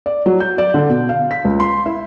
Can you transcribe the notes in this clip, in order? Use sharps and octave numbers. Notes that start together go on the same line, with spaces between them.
D5
F#3
G6
D5
D3
B2
F5
B6
C#2
C6
E4